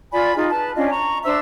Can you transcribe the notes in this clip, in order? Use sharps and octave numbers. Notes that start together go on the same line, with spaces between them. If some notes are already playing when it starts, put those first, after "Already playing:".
F4 D5 G#5 B5
D#4 F4 G#4
B4 A5
C#4 D4 F4 D#5
A#5 C#6
D4 C5 E5 E6